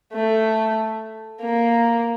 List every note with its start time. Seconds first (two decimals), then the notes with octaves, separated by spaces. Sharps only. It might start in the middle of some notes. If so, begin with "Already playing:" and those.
0.13 A3
1.42 A#3